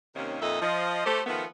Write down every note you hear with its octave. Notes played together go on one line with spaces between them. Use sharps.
D#2 C3 D#3 A#3 C#4
F2 A#2 D#4 A4 D#5 E5
F3 D#5
A3 G4 C5
D#3 F3 A3 B3